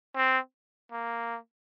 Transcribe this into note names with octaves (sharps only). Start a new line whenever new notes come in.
C4
A#3